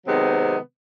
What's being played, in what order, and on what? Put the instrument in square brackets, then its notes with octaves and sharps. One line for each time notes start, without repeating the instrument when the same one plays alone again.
[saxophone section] C3 D#3 F#3 G#3 B3 C4